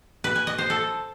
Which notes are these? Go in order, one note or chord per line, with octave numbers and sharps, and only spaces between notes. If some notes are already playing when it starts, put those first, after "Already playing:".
B4
G#5
D#5
C5
A4